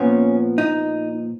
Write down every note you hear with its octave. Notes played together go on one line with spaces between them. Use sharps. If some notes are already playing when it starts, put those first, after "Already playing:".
Already playing: A#2 F3 B3 C#4
D#4